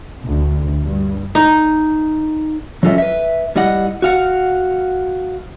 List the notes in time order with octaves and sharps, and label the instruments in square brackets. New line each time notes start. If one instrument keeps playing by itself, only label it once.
[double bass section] D2
G2
[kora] D#4
[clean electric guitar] F#3 C#4 F4 A4 D#5 E5
B4 E5
G3 E4 D#5 F#5
F#4 F5 F#5